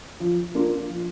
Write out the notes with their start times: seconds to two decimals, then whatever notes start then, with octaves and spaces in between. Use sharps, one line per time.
0.20 F3
0.55 A#3 D4 F4
0.89 F3